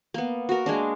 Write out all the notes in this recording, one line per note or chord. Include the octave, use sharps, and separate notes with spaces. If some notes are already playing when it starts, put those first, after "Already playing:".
A#3 B3
F#4 A#4
G#3 A#3 D4